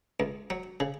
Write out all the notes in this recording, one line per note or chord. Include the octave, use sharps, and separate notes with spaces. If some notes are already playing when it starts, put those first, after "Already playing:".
C#2
F#3
C#3